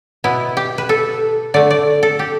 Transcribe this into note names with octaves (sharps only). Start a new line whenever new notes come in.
B2 B3 E4
G4
B4
A4
D3 A3 D5
D5
A4
G4